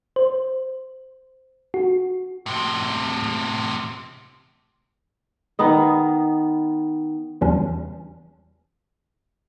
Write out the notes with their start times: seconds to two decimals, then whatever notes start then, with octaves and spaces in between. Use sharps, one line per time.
0.16 C5
1.74 F#4
2.46 A2 C3
5.59 D#3 B3 D#5
7.41 E2 C#3 E3 G3 C#4 D4